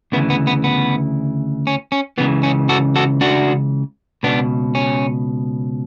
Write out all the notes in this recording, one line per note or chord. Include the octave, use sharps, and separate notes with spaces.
D2 C#3 E3 B3
B3
B3
B3
C#4
C#4
C#2 C#3 E3 B3
C#4
F#4 A4
F#4 A4
D4 F#4
C#2 B2 B3 D4
C#4